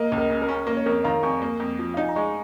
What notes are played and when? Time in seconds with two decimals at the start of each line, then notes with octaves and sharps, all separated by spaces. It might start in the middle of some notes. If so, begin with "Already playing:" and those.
Already playing: A#3 A#4 D#5
0.12 C#2
0.17 A#4 D#5
0.30 C#3
0.42 A#4
0.49 C#4
0.67 A#3 A#4
0.77 C#5
0.86 F2 A#4
1.04 D#3 F5 A#5
1.23 F2 G#5 C#6
1.42 A#3
1.60 F2
1.79 F3
1.94 F5
1.97 D#4 G#5
2.09 A#5
2.16 G#3 G#5 C#6